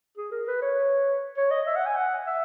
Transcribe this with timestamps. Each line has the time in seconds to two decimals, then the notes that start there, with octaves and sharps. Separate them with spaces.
0.17 G#4
0.31 A#4
0.48 B4
0.62 C#5
1.37 C#5
1.51 D#5
1.66 E5
1.76 F#5
1.86 G#5
1.96 F#5
2.27 E5